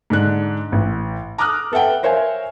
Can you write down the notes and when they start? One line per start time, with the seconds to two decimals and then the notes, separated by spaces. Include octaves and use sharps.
0.10 G#2 D3 D4 F#6
0.72 A1
1.38 A#5 D6 D#6 F6 F#6
1.72 B3 A4 E5 F#5 G5
2.03 A#4 C5 C#5 E5 F5 G#5